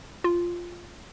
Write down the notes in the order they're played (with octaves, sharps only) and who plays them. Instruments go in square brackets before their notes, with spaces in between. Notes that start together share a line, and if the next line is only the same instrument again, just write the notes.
[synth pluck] F4